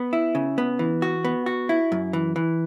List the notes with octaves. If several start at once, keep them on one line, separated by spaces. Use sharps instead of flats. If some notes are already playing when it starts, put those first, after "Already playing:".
Already playing: B3
E4
C#3
B3
E3
F#4
B3
F#4
E4
F#2
E3
E3